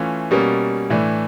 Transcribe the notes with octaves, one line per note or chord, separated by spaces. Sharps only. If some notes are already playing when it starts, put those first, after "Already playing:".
Already playing: E3 A3 C#4 F4
B2 G3 A#3 C#4
A2 E3 A3 D4